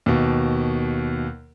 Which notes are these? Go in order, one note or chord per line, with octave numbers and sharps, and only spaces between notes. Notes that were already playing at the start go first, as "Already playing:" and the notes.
D#2 B2